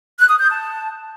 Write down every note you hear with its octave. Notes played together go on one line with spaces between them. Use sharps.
F#6
D#6
G6
A5